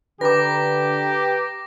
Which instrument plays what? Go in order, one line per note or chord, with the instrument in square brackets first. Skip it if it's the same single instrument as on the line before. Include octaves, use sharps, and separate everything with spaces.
[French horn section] D3 [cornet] G4 [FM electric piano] B4 A#5 [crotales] D6 A#6